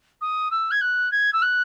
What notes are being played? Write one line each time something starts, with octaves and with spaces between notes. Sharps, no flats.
D#6
E6
G#6
F#6
G#6
E6
F#6